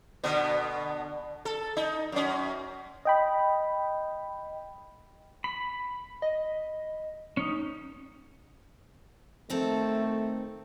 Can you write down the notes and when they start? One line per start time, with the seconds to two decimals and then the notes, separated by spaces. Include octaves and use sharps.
0.23 B2 D3 B3
1.45 A4
1.77 D#4
2.12 F#2 C#4
3.05 D#5 G5 B5
5.44 B5
6.22 D#5
7.37 C#4 D#4
9.50 D#3 A3 C4 A4